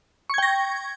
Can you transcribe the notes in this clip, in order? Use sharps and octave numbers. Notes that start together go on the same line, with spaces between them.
G5 C#6 G#6 A#6